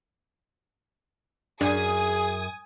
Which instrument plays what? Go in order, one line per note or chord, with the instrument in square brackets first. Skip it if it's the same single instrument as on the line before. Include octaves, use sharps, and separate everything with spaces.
[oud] F#2 [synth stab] D4 [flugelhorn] G#4 [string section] G#5 D#6